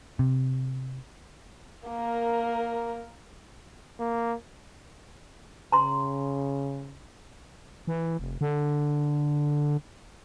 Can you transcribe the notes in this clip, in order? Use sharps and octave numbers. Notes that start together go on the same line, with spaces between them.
C3
A#3 A#4
A#3
C#3 A#5 C6
E3
F1
D3